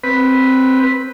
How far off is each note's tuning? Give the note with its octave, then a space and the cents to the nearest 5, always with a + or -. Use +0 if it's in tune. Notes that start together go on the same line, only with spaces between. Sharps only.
C4 +0 B4 +0